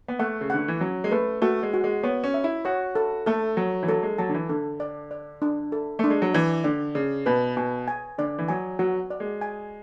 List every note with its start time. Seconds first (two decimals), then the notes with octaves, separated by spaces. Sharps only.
0.08 B3
0.19 A3 F#5
0.41 C#3
0.50 D3 F#5
0.68 E3
0.81 F#3 C#4
1.04 G#3
1.11 A3 B4
1.42 A3 F#4
1.63 G#3
1.73 F#4
1.84 G#3
2.03 B3 C#5
2.24 C#4
2.34 E5
2.44 E4
2.65 F#4 C#5
2.95 A4
3.26 A3 A4
3.57 F#3 C#5
3.83 E3
3.89 F#3 A4
4.03 G#3
4.18 F#3 A5
4.29 D3
4.34 E3
4.49 D3 A4
4.80 D5
5.11 D5
5.42 D4
5.72 A4
5.99 A3 D4
6.10 G#3
6.22 F#3
6.34 E3 D5
6.64 D3 D5
6.95 C#3 D5
7.26 B2 B4
7.57 B2 G#5
7.88 G#5
8.18 D3 D5
8.38 E3
8.48 F#3 G#5
8.79 F#3 F#4
9.10 D5
9.20 G#3
9.41 G#5